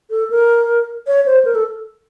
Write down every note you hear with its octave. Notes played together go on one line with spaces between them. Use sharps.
A4
A#4
C#5
C5
A#4
A4